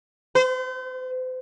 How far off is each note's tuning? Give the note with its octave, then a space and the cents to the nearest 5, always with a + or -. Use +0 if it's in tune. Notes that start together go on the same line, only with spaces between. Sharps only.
C5 -40